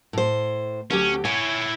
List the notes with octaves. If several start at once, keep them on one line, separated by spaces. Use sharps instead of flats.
A2 C5
D2 F#3 C#4 G4
E4 C#5 G#5